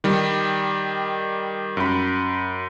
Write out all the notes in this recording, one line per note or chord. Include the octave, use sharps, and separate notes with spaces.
D#3 G3
F#2 B5